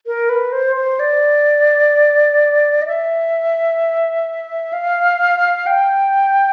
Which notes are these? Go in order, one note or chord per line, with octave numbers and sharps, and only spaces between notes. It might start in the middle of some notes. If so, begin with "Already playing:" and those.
A#4
B4
C5
C5
D5
D#5
E5
F5
G5